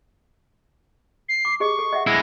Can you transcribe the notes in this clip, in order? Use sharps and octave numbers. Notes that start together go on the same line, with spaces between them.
C7
D6
G4 G#4 D#5 C#6
A4
D#5 E5 F#5
G#3 E4 A#6